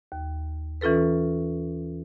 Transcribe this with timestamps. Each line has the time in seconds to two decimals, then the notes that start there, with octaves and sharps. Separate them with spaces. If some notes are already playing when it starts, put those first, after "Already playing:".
0.12 D#2
0.81 E3 C#4 F4 A4 B4